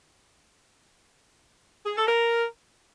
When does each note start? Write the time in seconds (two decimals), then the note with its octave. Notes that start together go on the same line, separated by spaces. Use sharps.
1.86 G#4
1.97 A4
2.07 A#4